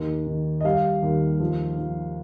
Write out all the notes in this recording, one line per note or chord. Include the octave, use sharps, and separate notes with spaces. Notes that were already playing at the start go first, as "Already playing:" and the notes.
Already playing: D#2 D#3
D#3
D#5
G3 F5
D#2
F3
F3